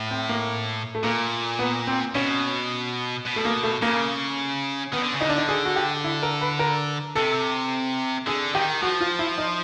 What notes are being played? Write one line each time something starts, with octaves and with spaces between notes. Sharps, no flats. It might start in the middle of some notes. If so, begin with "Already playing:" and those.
Already playing: A2
C4
A#3
A3
A#2 A#3
B3
C4
B2 C#4
B2
A3
A#3
A3
C#3 A#3
D#3 B3
D3
C#3
D3 D#4
D4
D#4
G#4
F#4
G4
E4
A#4
B4
A#4
C3 A4
D3 G#4
D#3 G4
F3 F#4
F4
E4
D#4